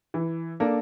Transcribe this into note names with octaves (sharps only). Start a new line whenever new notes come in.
E3
A#3 D4 A4